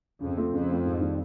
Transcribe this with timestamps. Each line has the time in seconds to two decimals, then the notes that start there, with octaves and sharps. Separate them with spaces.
0.21 F2 C#3
0.37 F3 A3 C4
0.53 F2 C#3
0.70 F3 A3 C4
0.85 G#2
1.01 D#3 G3